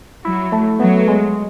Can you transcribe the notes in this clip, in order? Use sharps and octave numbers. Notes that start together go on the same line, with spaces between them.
F#3 E4
A3
F#3 B3
G#3